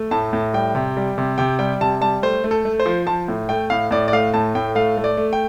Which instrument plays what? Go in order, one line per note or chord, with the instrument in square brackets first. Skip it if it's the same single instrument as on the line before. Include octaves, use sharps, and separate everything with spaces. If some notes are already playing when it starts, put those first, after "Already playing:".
Already playing: [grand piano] A3
A2 A5
A2
G3 G5
C3
G3
C3
C3 G5
G3 G5
C3 A5
G3 A5
A3 C5
A3
A4
A3
C5
F3
F3 A5
A2
A3 G5
A2 F5
A2 D5
D5
A3 F5
A2 A5
A2 G5
A3 F5
A3
D5
A3
G5